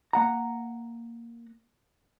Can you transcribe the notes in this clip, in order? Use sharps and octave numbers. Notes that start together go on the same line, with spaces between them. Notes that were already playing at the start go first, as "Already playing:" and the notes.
A#3 F#5 A#5